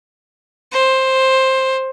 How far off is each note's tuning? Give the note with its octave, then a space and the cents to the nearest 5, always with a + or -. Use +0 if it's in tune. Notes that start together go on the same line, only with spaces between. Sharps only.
C5 +10